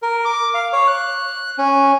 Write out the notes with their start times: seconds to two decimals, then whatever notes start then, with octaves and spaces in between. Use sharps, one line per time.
0.02 A#4
0.25 D6
0.54 F5
0.73 C#5
0.88 F#6
1.58 C#4